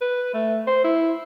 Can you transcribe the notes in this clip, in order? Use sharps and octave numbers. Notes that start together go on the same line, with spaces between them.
B4
A3
C5
E4